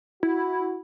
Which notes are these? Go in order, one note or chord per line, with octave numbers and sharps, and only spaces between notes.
E4 F#4